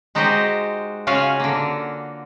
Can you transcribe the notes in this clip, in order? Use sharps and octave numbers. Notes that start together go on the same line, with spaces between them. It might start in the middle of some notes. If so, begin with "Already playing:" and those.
G#3 D#4 F#4 G4 C5 D#5
C#3 C#4 F4 F#4 F5 G#5
D3 A#3